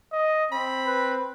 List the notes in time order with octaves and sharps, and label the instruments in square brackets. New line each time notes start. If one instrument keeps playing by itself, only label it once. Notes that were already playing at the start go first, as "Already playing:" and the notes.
[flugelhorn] D#5
[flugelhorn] C4 [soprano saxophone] B5
[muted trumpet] B4